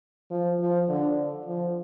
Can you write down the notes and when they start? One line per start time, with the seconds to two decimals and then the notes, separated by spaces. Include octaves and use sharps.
0.31 F3
0.59 F3
0.89 D3
1.46 F3